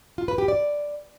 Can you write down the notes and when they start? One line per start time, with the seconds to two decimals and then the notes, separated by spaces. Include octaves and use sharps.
0.18 F4
0.28 B4
0.38 G4
0.48 D5